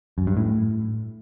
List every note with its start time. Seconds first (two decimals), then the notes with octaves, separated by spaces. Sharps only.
0.18 F#2
0.27 G2
0.37 A2